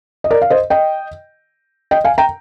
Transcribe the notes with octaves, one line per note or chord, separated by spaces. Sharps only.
D#5
A#4 D5
F5
C5 D#5
D#5 G5
D#5 G5
F5 G#5
G5 A#5